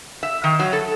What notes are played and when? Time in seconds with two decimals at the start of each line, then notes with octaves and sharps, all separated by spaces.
0.23 E5
0.44 D#3
0.59 F#3
0.73 A4